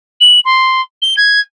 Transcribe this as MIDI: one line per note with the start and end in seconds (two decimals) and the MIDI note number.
0.20 0.40 102
0.45 0.81 84
1.02 1.15 103
1.17 1.40 92